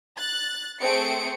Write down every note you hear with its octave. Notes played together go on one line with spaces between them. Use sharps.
F#6 A6
A3 C4 G#4 C5 C#7 D7